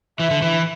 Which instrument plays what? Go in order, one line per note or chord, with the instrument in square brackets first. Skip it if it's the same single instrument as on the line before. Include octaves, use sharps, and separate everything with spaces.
[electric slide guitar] E3 [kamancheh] E5
[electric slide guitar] D3
E3